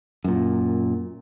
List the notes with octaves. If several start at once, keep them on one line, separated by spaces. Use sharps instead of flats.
F#2 A#2